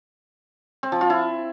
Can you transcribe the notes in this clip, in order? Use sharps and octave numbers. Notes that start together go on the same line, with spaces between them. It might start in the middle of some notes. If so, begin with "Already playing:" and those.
C4
F3
F4
E4